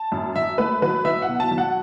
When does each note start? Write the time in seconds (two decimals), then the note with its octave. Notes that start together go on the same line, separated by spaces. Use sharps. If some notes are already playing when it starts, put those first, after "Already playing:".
Already playing: A5
0.12 F#2
0.35 F#2 E5
0.58 A3 B4
0.82 F#3 B4
1.05 F#3 E5
1.22 F#5
1.28 B2
1.40 A5
1.51 F#3
1.58 F#5